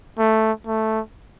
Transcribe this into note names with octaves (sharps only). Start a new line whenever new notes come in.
A3
A3